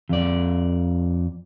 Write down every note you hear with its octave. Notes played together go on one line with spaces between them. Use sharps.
F2 D5